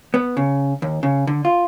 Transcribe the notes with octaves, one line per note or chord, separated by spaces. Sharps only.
B3
C#3
D#2
C#3
D3
F4